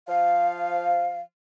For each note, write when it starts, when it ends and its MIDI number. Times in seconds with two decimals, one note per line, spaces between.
0.08 1.21 53
0.08 1.21 77